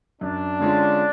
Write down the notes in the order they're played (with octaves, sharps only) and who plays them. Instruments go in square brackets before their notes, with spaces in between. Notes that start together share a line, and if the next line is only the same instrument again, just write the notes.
[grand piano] F#2 [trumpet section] D4
[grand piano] D3 G#3 C#4 F4